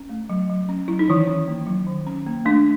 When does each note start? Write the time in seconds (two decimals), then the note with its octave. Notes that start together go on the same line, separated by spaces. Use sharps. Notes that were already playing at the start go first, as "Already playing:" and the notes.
Already playing: C#4
0.09 A3
0.30 F#3
0.50 F#3
0.69 C#4
0.88 F#3 E4
0.99 D#4
1.08 D#3 E3 E4
1.27 C#4
1.48 A#3
1.67 F#3
1.87 D#3
2.07 C#4
2.26 A#3
2.45 A3 D4